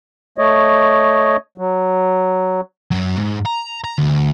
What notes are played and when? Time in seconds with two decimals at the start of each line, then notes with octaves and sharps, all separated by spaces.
0.38 A3 C#5 D#5
1.58 F#3
2.91 F#2 F#3
3.17 G#2
3.46 A#5
3.84 A#5
3.98 D2